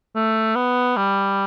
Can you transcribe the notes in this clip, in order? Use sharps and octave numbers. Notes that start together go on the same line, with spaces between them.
A3
B3
G3